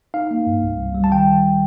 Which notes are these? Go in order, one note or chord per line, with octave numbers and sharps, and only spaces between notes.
D#4 F5
A#3
G2
C2
C2
G3
A5
D#3 G5